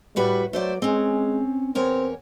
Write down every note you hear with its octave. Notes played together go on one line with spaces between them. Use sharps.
A2 G3 F#4 B4
F#3 A3 C5 D5
G#3 C4 C#4
E2 C4 A#4 C#5